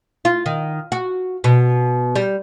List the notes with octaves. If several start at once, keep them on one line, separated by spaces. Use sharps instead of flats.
F4
D#3
F#4
B2
G3